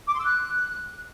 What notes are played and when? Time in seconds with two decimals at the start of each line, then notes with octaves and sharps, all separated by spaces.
0.07 D6
0.13 C6
0.19 E6
0.25 F#6